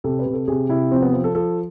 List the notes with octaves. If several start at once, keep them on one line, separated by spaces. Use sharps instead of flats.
C3 A4
B4
C3
A4
C3 G#4
C3 E4
F3 C4
B3
F3 C4
A4
F3 A4